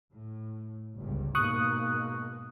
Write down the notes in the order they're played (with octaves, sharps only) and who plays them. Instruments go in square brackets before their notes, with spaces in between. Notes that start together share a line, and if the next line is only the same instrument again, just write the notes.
[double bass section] A2
G1 C#2 G2
[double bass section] G#2 B2 A#3 [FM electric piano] C#6 D#6 F#6